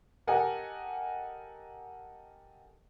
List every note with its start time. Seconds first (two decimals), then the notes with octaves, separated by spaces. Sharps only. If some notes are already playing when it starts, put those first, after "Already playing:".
0.27 G4 A4 A#4 D#5 F#5 G#5